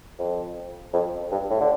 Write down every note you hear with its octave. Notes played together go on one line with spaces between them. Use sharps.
F2
F2
G2
A2
D3